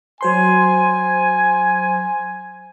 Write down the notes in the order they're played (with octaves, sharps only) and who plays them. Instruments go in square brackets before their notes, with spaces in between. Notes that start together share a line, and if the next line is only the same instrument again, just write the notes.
[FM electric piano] F#3 C5 C6 [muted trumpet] G#5